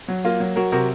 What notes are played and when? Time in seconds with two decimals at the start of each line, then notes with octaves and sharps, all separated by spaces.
0.08 F#3
0.25 A#3 F4
0.40 F#3
0.56 F#3 F#4 A#4
0.72 C3 F#4 A#4